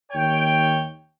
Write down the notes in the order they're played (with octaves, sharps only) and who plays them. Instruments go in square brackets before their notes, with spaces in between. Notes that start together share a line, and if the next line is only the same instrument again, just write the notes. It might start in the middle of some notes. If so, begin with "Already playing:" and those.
[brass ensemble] D#2 C#5 G5